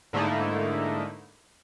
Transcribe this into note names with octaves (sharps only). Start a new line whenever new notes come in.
G#2 D3 A3 A#3 D#4 E4